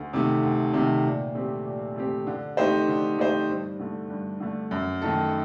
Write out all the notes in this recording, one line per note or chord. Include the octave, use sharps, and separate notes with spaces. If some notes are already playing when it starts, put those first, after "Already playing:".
Already playing: D2
C3 D#3 A3
D2
C3 D#3 A3
A#2
A3 C4 G4
A#2
A3 C4 G4
D3
A3 D#4 G4 C5
D3
A3 D#4 G4 C5
G2
D3 A3
G2
D3 A3
F#2
D#3 A3 D#4 A4